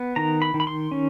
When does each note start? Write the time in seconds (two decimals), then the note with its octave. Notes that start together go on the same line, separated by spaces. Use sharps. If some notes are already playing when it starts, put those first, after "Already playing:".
Already playing: B3
0.16 D#3 A#5
0.42 B5
0.54 D#3
0.60 B5
0.67 C6
0.91 C#4